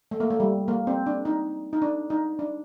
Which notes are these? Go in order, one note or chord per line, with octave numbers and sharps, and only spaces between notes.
A3
A#3
A3
G3
A#3
C4
D4
D#4
D#4
D4
D#4
D4